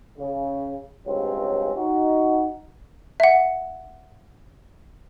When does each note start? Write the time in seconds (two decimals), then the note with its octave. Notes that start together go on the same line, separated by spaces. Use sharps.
0.18 C#3
1.06 C#2 G2 F#3 C4 C#4
1.76 D#4 F#4
3.20 E5 F#5